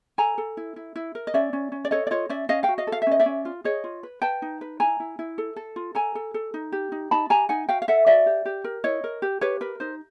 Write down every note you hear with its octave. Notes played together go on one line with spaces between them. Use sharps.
A4 G#5 A#5
A4
E4
E4
E4
A#4
D#5
C#4 D5 E5
C#4
C#4
D5
A4 C#5 D#5
D5
F4 C#5 D#5
C#4 D5 E5
C#4 D#5 F5
F5 G5
F#4
D#5 F5
A4
F5
E5
C#4 D#5
D5 E5
C#4
F4
G#4 C#5 D#5
F4
B4
B4 G5 A5
D#4
B4
E4 G#5 A#5
E4
E4
A4
A4
F4
A4 G#5 A#5
A4
A4
D#4
G4
D#4
D#4 A5 B5
G4 G#5 A#5
D#4 F#5 G#5
F#4 F5 G5
F5
A4 E5 F#5
F#4 D5 E5
G4
G4
A#4
E4 C#5 D#5
A#4
G4
G4 B4 C#5
A#4 B4
D#4 C5